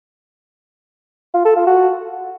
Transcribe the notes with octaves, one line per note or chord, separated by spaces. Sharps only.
F4
A4
F4
F#4